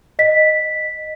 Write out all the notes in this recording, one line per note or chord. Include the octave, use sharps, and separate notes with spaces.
D#5 B6